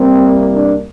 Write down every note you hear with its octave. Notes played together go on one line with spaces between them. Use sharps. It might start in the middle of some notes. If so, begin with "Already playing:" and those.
Already playing: C2 C3 G3 A#3 C4
D4